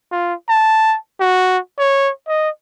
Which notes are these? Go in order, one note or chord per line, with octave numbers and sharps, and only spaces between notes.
F4
A5
F#4
C#5
D#5